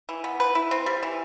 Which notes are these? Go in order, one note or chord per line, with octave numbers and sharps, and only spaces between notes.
E3
B3
B4
E4
C4
G3
E3